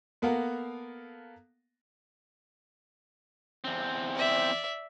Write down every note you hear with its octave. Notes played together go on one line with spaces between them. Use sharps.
A#3 B3 A4 A#4 F5 F#5
E2 C4
D5 E5